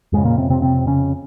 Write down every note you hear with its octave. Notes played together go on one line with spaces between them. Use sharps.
F2 G#2 C#3 G#3
A#2 A#3
C3 C4
C3 C4
C3 C4
C#3 C#4